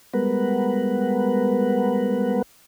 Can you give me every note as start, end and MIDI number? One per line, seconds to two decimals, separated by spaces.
0.13 2.42 55
0.13 2.42 56
0.13 2.42 59
0.13 2.42 70
0.13 2.42 71
0.13 2.42 78